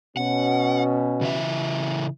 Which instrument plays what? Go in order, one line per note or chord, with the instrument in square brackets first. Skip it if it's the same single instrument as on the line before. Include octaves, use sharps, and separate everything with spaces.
[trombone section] B2 C#4 [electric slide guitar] F#5
[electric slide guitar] C#3 E3 E5